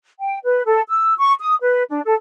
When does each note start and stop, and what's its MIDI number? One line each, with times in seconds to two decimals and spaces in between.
0.20 0.39 79
0.44 0.63 71
0.66 0.81 69
0.89 1.14 88
1.18 1.33 85
1.40 1.56 87
1.62 1.83 71
1.89 2.00 62
2.05 2.14 69